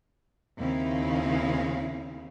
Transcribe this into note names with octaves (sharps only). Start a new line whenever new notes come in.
D#2 C#3 C4 D#4 E4 F5